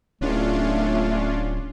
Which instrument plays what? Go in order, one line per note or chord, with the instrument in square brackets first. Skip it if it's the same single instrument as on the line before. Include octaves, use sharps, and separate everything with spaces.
[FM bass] D1 [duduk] A3 [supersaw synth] C#4 D4 F4